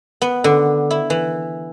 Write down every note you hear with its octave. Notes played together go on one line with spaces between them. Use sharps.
B3
D3
E4
E3